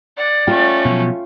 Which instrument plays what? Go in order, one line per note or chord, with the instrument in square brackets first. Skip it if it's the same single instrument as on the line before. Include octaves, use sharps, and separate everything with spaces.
[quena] D5 [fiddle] F#5
[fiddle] A3 C#4 [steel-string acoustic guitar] F4 G5
[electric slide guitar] B2 F3 F#3